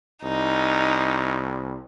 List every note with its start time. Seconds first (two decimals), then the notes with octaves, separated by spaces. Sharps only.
0.23 C2 D#4